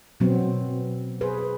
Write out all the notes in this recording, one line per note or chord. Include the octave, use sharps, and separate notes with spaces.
B2 F#3 B3 C4
G#4 B4 C5